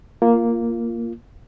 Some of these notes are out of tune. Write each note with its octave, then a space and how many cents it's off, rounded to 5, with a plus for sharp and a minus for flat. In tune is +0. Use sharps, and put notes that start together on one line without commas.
A#3 +0 F4 -10